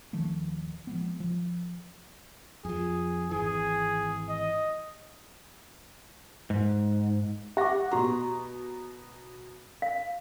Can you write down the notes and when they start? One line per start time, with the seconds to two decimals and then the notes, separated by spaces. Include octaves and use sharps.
0.13 D#1 D#3 F3 A3
0.87 F3 G#3 B3
1.20 F3
2.65 F2 F3 G#4
3.31 G#1 E3 G#4
4.29 D#5
6.50 G#2
7.57 G4 F#5 D6 A#6
7.91 B2 F#4 A#5 C#6
9.82 F5